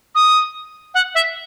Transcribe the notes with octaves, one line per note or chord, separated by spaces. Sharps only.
D#6
F#5
E5